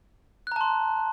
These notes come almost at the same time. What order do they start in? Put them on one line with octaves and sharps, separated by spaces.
F#6 A#5 A5 C6